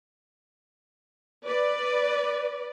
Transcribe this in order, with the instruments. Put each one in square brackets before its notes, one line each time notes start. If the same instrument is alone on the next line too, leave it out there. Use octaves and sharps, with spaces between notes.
[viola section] B4 D5